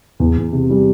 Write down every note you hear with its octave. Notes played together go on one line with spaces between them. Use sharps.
E2
E2
C3
G3